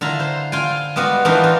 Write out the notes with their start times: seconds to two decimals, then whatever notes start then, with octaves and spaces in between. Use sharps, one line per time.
0.01 D3 E4 F4 A#5
0.20 C5
0.52 F4 G5 G#5
0.96 G3 G#3 B3 F4 F#4
1.25 E3 G3 D4 D#4 F4 F#4
1.44 F4